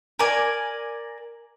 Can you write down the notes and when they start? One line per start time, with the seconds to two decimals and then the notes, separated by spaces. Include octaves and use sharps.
0.19 A#4 D5 G#5